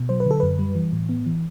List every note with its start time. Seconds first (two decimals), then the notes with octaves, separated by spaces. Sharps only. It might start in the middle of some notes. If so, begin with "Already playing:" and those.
Already playing: B2
0.09 F#3 C5
0.20 B4
0.26 D3 A4
0.40 F#2 B4
0.59 G3
0.75 E3
0.93 A2
1.09 B3
1.26 E3